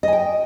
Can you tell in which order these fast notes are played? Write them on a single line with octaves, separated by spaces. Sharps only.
D#5 G#5 G5